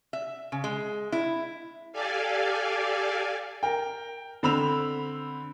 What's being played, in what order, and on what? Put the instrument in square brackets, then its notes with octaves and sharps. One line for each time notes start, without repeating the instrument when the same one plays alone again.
[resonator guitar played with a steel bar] E5
C#3
G#3
E4
[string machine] G4 A4 D5 F5 G#5
[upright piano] A#4 G5
D3 C4 B5 E6 F7